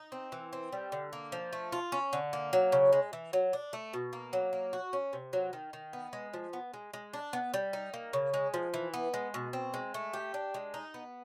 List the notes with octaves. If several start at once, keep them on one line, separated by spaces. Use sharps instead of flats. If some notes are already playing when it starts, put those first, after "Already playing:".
Already playing: D#4
C4
E3
C4
G3
D3
A#3
F3
A3
F4
C#4
D3
A#3
F#3
C#3
G#3
E3
F#3
D4
A3
B2
A#3
F#3
A#3
F#4
C#4
C3
F#3
D#3
D#3
B3
G#3
F3
B3
G#3
G#3
D4
B3
G3
D#4
A#3
C#3
G#3
F3
E3
B3
G#3
B2
C4
G#3
A3
G4
D4
G#3
D#4
B3